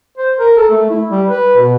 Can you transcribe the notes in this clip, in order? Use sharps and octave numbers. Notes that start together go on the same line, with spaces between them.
C5
A#4
A4
A3
E4
G3
B4
B2